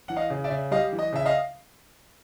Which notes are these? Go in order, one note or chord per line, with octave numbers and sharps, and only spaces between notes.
E3 F#5
D#5 F5
C#3
D5 E5
C#3
G3 D#5 F5
E3
D#5
C#3 E5
D#5 F5